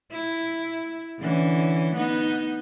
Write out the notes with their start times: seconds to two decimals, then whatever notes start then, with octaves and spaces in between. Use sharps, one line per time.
0.12 E4
1.19 D3 E3 C#4
1.95 B3 D#4